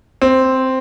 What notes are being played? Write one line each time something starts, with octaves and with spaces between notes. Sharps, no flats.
C4